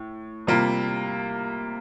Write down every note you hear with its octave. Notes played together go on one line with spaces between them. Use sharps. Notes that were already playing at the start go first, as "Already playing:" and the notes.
Already playing: A2
C3 G3 A#3 F4